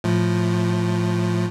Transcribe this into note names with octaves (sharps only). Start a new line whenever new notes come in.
A2 F3